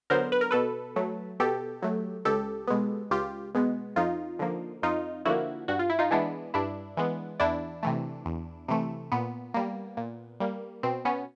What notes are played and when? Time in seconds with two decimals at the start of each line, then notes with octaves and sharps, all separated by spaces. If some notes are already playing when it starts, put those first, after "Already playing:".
0.10 D3 F#3 B3 A#4 C5
0.32 B4
0.41 A#4
0.51 B2 A4 B4
0.96 F#3 A3
1.40 B2 G4 A4
1.82 F#3 A3
2.25 C#2 G4 A4
2.67 B2 G#3 B3
3.10 C#2 F4 G4
3.54 B2 G#3 B3
3.96 F2 D#4 F4
4.39 D3 F3 A#3
4.82 F2 D#4 F4
5.25 D3 F3 A#3 E4 F#4
5.68 G2 F#4
5.79 F4
5.90 E4
5.99 D#4 F4
6.11 E3 G#3 B3 D4 E4
6.54 G2 D4 E4
6.97 E3 G#3 B3
7.40 E2 D4 E4
7.83 C3 E3 A3
8.25 E2
8.68 C3 E3 A3
9.12 A#2 B3
9.54 G3 A#3
9.97 A#2
10.40 G3 A#3
10.83 B2 C4
11.05 B3 C#4